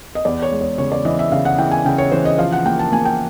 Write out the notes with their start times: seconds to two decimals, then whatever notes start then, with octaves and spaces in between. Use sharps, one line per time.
0.15 D#5
0.25 E2 D5
0.42 C#5
0.51 G#3
0.61 C#5
0.78 C#3 C#5
0.92 D5
1.05 E3 D#5
1.19 E5
1.32 C#3 F5
1.45 F#5
1.59 E3 G5
1.71 G#5
1.85 C#3 G5
1.98 C#5
2.12 E3 C5
2.25 D#5
2.38 F3 F5
2.52 F#5
2.65 A#3 G5
2.79 A5
2.92 A#3 G#5
3.05 G5